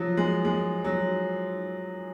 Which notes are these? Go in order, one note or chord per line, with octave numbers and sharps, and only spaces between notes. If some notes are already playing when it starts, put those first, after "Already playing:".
Already playing: F3 F#3
G#3
G#3
F#3